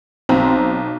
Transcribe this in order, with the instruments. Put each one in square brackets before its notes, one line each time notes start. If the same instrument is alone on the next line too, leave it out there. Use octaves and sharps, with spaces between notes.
[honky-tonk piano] B1 A#5 [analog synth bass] C4